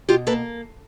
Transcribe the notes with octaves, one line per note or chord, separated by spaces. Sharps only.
B2 F4 G4
A#3 A4 B4